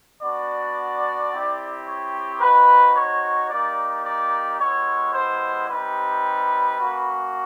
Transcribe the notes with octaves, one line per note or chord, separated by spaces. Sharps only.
B3 D4 F#4 D5
C4 E4 G4
C#5
C4 D#4 F#4 B4
C#5
A#3 D#4 G4 D5
D5
G#3 B3 E4 G4 C#5
C5
G3 C4 D#4 G4 B4
A#3 C#4 F#4